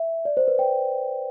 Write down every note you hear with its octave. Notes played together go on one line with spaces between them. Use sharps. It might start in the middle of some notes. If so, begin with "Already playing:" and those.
Already playing: E5
D5
C5
B4
G5